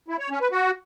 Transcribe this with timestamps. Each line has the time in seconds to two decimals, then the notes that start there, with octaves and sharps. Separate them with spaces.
0.08 E4
0.19 C#5
0.30 C#4
0.41 B4
0.52 F#4